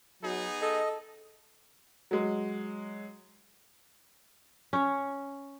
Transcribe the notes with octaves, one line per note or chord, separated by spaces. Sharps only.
F#3 B3 D#4 G#4
A4 D#5
F#3 G#3
C#4 C#5